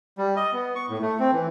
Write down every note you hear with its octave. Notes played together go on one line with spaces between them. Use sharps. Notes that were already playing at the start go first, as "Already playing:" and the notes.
G3
D#5
B3
C#6
A2
A3
C4
E3